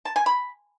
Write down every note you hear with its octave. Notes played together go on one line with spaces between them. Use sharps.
A5
G#5
B5